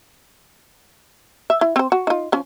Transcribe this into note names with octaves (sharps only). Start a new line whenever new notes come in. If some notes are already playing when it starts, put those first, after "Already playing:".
E5
E4
C4 C5
F#4
D#4 F4
F3 C#4